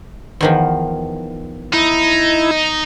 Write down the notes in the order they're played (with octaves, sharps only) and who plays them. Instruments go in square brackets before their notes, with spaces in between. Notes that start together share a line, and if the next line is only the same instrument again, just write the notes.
[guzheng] E2 D#3 F3
[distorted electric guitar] D#4 [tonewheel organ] E4